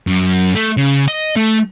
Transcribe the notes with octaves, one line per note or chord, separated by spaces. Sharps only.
F#2
A3
C#3
D#5
A3